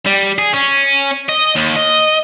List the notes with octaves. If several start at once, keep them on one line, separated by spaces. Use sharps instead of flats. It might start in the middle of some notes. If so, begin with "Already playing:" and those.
G3
G#4
C#4
D#5
D#2
D#5